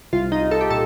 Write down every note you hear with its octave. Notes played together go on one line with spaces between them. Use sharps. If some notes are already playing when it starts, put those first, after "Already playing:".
C2 F4
D#4
C2
A4
G4
A#2 A4